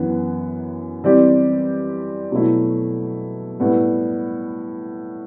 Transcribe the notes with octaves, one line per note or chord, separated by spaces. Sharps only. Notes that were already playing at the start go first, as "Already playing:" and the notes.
Already playing: F#2 E3 B3
E3 G3 C4 G4 D5
B2 F#3 A3 E4
A2 G3 B3